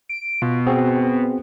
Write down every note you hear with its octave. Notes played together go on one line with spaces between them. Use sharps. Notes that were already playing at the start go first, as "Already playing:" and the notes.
D7
B2 F4
C4 F#4 G#4